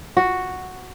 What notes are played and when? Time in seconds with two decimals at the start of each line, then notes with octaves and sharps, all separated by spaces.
0.17 F#4